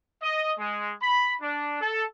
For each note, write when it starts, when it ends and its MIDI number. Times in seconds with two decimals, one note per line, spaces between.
0.22 0.53 75
0.58 0.92 56
1.01 1.35 83
1.41 1.77 62
1.81 2.04 69